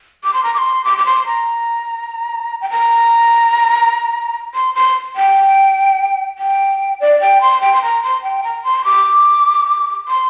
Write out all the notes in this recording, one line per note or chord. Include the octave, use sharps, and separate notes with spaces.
D6
C6
A#5
D6
C6
D6
D6
C6
A#5
G5
A#5
C6
C6
G5
G5
D5
G5
C6
G5
C6
A#5
C6
G5
A#5
C6
D6
C6